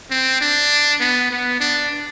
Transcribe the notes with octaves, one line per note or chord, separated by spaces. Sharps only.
C4
D4
B3
B3
D4